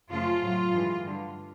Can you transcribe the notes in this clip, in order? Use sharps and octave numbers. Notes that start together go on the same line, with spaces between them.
F#2 C#3 F3 A3 F4
A2 F#3 A3
G2 E3 G#3
G2 D3 G3